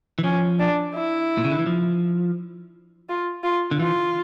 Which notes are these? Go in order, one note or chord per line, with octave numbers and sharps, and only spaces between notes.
E3
F3 C#4
D4
E4
A#2
C#3
D3
E3
F3
F4
F4
D3
E3 F4